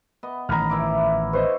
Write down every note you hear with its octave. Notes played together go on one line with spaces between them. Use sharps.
B3 D#5
A1 D#3 A#5 B5 F6
E3 E4 D6
B4 C5 D#5 C#6